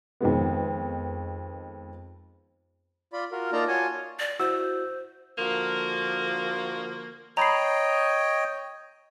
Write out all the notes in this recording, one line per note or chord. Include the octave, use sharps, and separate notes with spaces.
F2 D#3 G#3 B3
F4 D5 B5
F4 F#4 A#4
A#3 D#4 F4 D5 A5 A#5
F4 F#4 C#5 G#5 A5
D5
E4 F#4 C5 E6
D3 F3 A#3 F#4 A#4
C#5 D#5 G5 A#5 B5 C7